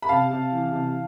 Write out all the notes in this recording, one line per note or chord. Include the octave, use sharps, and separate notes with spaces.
B5
C3 F5 A5
C3
E3
C3